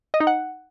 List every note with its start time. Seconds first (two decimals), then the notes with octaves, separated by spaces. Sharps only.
0.14 D#5
0.20 D#4
0.27 F#5